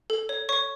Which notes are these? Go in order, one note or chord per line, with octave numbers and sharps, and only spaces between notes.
A4
C#5
C#5 C#6